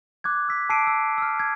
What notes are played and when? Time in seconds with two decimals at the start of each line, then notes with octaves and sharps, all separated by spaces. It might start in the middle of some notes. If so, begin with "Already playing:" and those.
0.24 D6 F#6 G#6
0.48 E6 B6
0.69 A5 D6 E6 C7 D7 D#7
0.87 E6
1.18 E6 F6
1.40 G#6